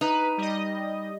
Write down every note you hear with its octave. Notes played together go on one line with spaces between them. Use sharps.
D#4 B4
G3 D#5